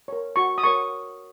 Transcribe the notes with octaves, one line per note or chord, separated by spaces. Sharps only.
A#4 C#5
F#4 C#6
D#6
A#4 C#5 C#6